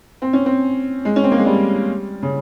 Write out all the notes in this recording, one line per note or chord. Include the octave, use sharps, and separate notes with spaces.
C4
C#4
C4
G#3
C#4
C4
A#3
G#3
G3
C#3